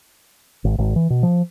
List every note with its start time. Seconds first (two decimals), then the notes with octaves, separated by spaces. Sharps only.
0.64 G#1
0.78 G#1
0.96 E3
1.10 B2
1.23 F3